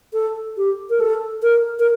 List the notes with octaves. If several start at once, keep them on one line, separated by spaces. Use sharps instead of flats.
A4
G4
A#4
A4
A#4
A#4